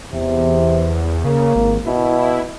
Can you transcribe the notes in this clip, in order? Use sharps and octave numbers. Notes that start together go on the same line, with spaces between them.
E2 C3
C#3 A#3
G#1
B2 E4